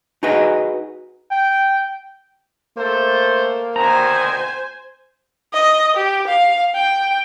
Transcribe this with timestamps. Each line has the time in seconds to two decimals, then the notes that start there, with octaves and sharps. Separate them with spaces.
0.23 D#4 F#4 G#4 B4 D#5
1.31 G5
2.77 A3 A#3 A4 C5
3.76 D2 B2 D#3 C5 G#5 A#5
5.54 D#5
5.96 G4
6.27 F5
6.75 G5